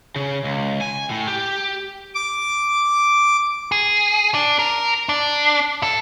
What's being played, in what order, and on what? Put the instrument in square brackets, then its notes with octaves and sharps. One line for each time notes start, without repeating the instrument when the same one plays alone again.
[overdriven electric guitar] C#3
C#2
G#5
A2
G4
[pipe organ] D6
[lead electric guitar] G#4
D4
A#4
D4
A4